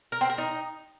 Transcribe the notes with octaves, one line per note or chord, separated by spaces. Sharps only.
A#4
C4
A#4
D#4